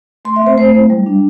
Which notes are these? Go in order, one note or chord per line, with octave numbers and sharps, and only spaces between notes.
A3 C6
E5
C4 C5
A3 C5
E4
G3
D4